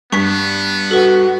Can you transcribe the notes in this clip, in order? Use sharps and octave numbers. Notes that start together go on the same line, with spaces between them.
G2 B3 C#6 B6
F#4 A4 B4